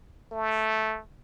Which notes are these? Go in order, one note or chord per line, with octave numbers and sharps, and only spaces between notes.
A3